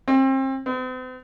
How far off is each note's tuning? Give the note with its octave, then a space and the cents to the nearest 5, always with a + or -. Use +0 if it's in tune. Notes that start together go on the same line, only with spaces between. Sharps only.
C4 +35
C4 -45